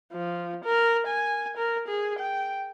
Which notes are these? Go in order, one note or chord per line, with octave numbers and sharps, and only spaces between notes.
F3
A#4
G#5
A#4
G#4
G5